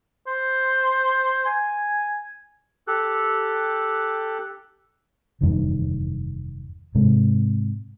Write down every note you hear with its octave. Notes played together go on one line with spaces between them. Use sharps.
C5
G#5
G4 A4 F#6
F1 E2 G2 D#3
G#2 C3 G#3